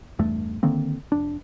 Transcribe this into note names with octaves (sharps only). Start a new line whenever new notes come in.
A1 E2 G2 A3
D3 D#3 A#3 C4
F1 D4